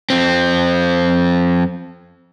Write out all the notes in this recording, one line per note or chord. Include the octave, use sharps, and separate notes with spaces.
F2 C4